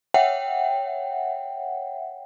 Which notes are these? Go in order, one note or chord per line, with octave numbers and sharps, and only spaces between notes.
C#5 E5 F#5 G5